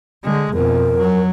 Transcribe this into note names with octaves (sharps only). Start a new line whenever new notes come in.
D3 G#3
F2 B2 A#4
F#3